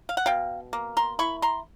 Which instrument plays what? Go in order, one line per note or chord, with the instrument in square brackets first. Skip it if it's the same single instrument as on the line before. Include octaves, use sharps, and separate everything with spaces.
[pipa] F5
F#5
B2 F5 G5
A#3
A#5 C6
E4 B5 C#6
A#5 C6